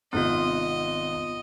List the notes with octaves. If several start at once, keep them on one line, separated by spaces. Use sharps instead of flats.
G#1 C3 B3 F4 D#5 F#6